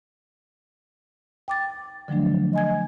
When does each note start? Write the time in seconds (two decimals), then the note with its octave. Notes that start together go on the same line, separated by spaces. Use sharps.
1.48 G5 D6 A6
2.08 D3 F3 F#3 A3 D4
2.53 D#5 G#5 G#6